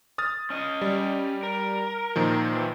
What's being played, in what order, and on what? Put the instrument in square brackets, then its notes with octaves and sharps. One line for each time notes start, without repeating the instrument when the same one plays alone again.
[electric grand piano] D#6 F6 A6
[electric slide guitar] C#4 D#5
[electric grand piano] G3
[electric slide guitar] A#4
[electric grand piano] A#2 D#3 F3
[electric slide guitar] E3